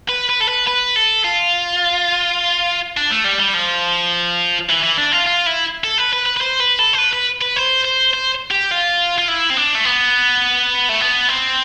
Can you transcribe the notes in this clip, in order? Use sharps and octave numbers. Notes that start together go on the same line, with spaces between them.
B4
B4
A4
B4
B4
A4
F4
D4
A3
G3
G3
F3
E3
E3
D4
F4
F4
E4
A4
B4
B4
B4
B4
C5
B4
A4
C5
B4
B4
B4
C5
C5
C5
G4
F4
F4
E4
C4
D4
A3
B3
A3
B3
C4